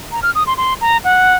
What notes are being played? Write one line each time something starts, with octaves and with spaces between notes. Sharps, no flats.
A#5
F6
D#6
C6
C6
A#5
F#5